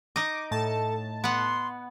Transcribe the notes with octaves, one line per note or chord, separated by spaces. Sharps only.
D#4 D#5 D6
A2 A4 A5
B3 F#5 C6